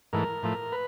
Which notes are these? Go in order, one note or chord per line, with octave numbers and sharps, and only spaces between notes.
G#2 E3 A3 A#4
A2 F3 A3
B4